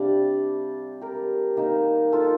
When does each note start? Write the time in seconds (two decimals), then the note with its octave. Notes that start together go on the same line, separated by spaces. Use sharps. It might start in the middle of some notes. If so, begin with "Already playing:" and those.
Already playing: C3 G3 D4 D5 F5 G5
1.01 G4 A#4
1.57 D#3 A#3 D#4
2.12 F4 A4